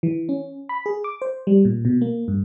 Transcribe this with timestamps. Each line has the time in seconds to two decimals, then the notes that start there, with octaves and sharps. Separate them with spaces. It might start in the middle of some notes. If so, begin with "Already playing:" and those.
0.03 E3
0.29 C#4
0.69 B5
0.86 G#4
1.04 D6
1.22 C5
1.47 G3
1.65 A#2
1.85 B2
2.01 A#3
2.28 G2